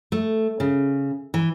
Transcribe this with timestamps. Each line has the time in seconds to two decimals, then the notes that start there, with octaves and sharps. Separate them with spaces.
0.12 A3
0.60 C#3
1.34 E3